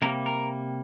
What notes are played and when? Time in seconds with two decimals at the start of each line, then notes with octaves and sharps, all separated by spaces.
0.02 C3 G3 A#3 A#4
0.26 A#4